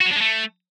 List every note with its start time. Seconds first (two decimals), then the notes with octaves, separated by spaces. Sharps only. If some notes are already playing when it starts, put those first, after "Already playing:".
0.01 F#4
0.06 F#3
0.11 D4
0.16 G#3
0.21 A3